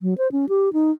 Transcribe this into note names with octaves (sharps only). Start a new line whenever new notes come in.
F#3
C5
C#4
G4
D#4